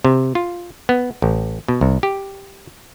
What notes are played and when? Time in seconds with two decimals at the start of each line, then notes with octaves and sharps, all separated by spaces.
0.05 C3
0.35 F4
0.89 B3
1.22 A1
1.68 B2
1.81 C2
2.03 G4